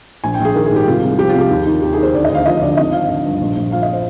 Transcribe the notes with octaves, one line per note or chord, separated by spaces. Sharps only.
A#1 G#5
G5
A#1
G#4
D#3 A#4
G#4
G#2
G4
C2 F4
C2
F3 G4
F4
C3
G4
D#2
D#3
D#2 G4
G#4
D#3
C5
D2 D5
D#5
D2 F5
F3 D#5
D3 D5
G#1 D#5
F3 F5
D3
G2
A#1
A#1
F3 F5
D#5
C5